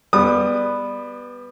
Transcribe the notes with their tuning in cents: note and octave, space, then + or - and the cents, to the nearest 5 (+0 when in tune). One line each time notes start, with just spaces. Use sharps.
G3 +15 B3 +0 D#6 -30